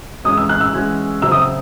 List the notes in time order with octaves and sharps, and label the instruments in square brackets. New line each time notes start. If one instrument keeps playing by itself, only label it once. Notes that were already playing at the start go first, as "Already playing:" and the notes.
[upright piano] E3 G#3 C#4 F#4 [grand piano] D#6
[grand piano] E6
F#6
E6
[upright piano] E3 G#3 C#4 F#4
[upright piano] C#3 F#3 C4 E4 [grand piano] E6
[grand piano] D#6
E6